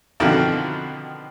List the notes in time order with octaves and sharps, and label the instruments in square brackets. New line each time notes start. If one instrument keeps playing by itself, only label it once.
[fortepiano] B2 D3 D#3 F3 B3 C4